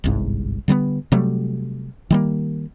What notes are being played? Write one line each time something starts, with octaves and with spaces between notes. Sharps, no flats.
G1 C2 G#2
D3 G3 A3 B3
C3 F#3 G3 A3
D#3 G3 A#3